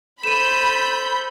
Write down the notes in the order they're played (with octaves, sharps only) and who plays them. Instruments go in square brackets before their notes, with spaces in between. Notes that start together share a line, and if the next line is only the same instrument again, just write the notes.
[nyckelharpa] A4 C5 [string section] B5 G6 [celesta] D#7 E7